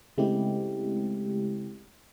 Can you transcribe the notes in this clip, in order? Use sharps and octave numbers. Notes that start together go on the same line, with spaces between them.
C#3 G#3 A3 C4 E4 G4